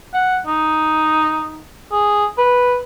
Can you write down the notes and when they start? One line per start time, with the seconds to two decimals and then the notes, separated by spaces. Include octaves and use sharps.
0.14 F#5
0.47 D#4
1.91 G#4
2.38 B4